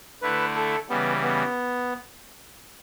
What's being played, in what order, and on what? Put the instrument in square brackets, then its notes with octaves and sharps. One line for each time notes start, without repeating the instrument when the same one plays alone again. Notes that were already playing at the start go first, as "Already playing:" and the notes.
[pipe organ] D3 A3 E4 [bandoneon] B4
[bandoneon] A4
[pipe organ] C#3 E3 G3 [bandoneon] B3
[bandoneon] B3